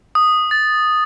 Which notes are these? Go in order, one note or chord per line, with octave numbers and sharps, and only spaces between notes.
D#6
A6